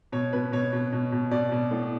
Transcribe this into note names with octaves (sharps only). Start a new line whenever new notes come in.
B2 C#5
B2 B4
B2 C#5
B2
B2
B2
B2 D5
B2
A2